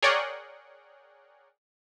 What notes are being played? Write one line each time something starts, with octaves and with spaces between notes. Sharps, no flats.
G#4 A#4 C#5 D5 F#5 G5